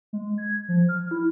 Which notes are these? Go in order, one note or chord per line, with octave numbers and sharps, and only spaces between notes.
G#3
G#6
F3
F6
E4